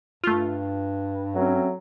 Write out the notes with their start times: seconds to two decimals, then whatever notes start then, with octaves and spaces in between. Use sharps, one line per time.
0.24 G2 A3 F4
1.35 F#3 A3 C4 C#4